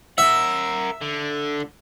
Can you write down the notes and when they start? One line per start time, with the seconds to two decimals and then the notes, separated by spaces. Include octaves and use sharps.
0.18 A#4 E5 F#5
1.01 D3